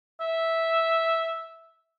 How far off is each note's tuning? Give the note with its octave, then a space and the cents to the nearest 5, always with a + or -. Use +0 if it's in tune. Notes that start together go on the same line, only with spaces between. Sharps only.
E5 -5